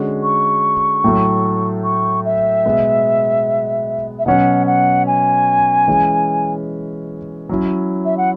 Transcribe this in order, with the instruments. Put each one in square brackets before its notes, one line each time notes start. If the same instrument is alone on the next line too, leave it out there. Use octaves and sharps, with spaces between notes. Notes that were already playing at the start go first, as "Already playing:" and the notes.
Already playing: [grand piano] D3 G#3 C#4 F#4
[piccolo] C#6
[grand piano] A2 F#3 A3
[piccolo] C#6
E5
[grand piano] B2 G#3 B3
[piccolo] E5
[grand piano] B2 F#3 C#4 [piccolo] F#5
[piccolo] F#5
G#5
[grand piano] E3 G#3 C#4
F#3 C#4 E4
[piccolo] E5
F#5